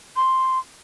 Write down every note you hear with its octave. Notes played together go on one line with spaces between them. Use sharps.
C6